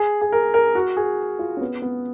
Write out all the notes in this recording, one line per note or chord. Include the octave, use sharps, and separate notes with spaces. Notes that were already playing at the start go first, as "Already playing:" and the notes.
Already playing: G#4
G#4
A#4
A#4
F#4
G#4
F4
C#4
B3
B3